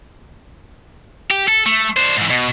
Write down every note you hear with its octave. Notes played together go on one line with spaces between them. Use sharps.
G4
A4
A3
D4 C5
G#2 E3
B2